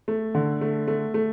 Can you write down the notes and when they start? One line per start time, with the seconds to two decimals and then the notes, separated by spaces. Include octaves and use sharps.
0.08 A3
0.35 D3
0.61 A3
0.88 A3
1.14 A3